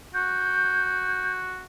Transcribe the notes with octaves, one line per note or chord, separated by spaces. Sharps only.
F#4 G6